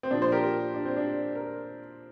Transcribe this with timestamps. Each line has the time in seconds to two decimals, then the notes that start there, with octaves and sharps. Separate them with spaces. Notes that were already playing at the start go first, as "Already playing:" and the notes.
0.03 C4
0.11 A#2 F3 D4
0.22 C5
0.32 G4 A#4
0.74 D4
0.85 C4
0.96 D4
1.36 A#4